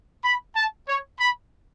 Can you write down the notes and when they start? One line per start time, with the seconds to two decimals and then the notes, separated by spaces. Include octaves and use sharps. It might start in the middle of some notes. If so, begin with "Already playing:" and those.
0.24 B5
0.56 A5
0.88 C#5
1.20 B5